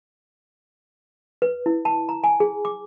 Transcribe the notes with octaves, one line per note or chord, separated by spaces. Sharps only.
B4
E4
A5
A#5
G#5
G#4
D6